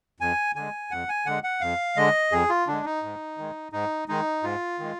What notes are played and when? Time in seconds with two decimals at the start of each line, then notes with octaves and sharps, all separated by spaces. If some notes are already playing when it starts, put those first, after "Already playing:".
0.20 F2 G#5
0.56 D3 G#3 G#5
0.91 F2 F#5
1.09 G#5
1.26 D3 G#3 F#5
1.44 F#5
1.61 F2 F5
1.97 D3 G#3 D#5
2.32 F2 G#4
2.50 F4
2.67 D3 G#3 D4
2.85 D#4
3.03 G#2
3.38 D#3 G#3
3.72 G#2 D#4
4.08 D#3 G#3 D#4
4.43 G#2 F4
4.79 D#3 G#3